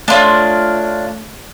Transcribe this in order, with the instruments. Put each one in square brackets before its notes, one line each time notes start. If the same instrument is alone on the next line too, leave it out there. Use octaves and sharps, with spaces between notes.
[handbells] A3 C#5 [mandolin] D4 F4